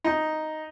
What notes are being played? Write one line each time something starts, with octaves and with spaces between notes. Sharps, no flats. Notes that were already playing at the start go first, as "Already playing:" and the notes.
D#4